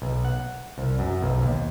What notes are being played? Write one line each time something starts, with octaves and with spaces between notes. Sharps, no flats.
B1
F#5
C2
F#2
B1
D#2